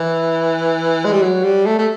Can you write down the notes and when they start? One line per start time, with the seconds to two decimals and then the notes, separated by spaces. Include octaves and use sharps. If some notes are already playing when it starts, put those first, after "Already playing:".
Already playing: E3
1.05 G#3
1.13 G3
1.22 F#3
1.44 G3
1.66 A3
1.79 A3